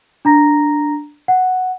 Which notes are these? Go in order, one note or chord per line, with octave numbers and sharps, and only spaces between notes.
D4 A#5 A#6
F#5